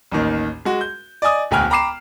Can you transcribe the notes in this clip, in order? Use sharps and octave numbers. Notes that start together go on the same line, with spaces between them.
A1 D#2 D#3
G#3 F#4
G6
D5 D#5 G#5 D#6
E1 D2 G5 G#5 F6 F#6
G5 A#5 B5 D6 C7 E7